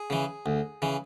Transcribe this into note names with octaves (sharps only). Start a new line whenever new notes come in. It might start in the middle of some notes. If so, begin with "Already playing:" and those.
Already playing: G#4
C#3 E3
D2
C#3 E3